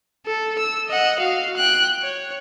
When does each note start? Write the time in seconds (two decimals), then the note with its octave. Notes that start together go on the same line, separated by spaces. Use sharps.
0.26 A4
0.58 E6
0.88 D#5 F#5
1.19 F#4 F5
1.56 G5 F#6
2.01 C#5